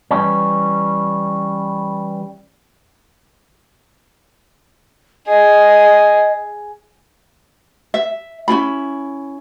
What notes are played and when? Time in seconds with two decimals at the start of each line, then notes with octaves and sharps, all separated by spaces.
0.11 E3 G3 C#4
5.27 G#4 D#5
7.94 E5
8.48 C#4 E4 F4 B5